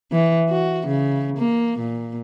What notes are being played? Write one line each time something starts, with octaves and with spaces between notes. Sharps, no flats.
E3
F#4
C#3
A#3
A#2